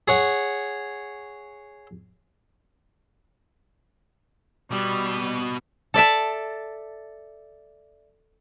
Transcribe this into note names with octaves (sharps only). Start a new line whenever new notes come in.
G#4 C#5 F#5
B2 G3 B3
A4 D5 E5 A5